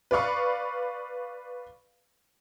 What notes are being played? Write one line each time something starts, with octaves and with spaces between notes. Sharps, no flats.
B4 D5 F5 C#6